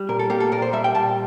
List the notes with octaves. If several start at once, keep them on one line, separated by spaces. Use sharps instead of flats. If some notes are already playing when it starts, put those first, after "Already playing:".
Already playing: G3
A#2 A#4
A4
A#3 G4
A4
A#2 A#4
C5
G3 E5
G5
A#2 A5